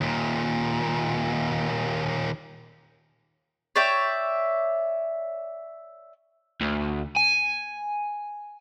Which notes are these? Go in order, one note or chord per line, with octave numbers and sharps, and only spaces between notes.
D#2 A#2
C#5 D5 E5 G5
D2
G#5